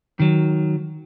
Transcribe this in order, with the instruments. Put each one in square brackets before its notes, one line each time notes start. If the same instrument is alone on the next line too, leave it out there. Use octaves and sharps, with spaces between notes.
[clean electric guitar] D#3 F#3